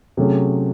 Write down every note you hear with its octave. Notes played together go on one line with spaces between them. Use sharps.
C3 F#3 A3 C#4 G#4